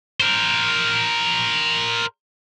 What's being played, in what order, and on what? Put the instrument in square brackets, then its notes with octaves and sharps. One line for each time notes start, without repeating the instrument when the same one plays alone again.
[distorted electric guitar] A#4 C5